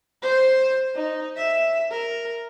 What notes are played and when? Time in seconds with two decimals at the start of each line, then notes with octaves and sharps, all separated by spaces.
0.22 C5
0.95 D#4
1.37 E5
1.91 A#4